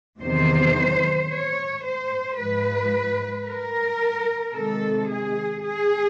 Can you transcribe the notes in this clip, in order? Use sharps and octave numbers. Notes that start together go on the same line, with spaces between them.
E2 C3 D#3 F#3 C5
C#5
C5
G#2 F3 G#3 B4
A#4
C3 D#3 G#3 A4
G#4
G#4